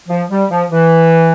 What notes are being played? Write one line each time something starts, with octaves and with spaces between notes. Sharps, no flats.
F3
G3
F3
E3